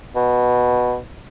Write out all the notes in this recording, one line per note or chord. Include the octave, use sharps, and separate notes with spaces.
B2